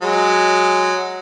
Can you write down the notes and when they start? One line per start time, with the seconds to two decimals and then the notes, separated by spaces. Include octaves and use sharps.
0.02 F#3 G#3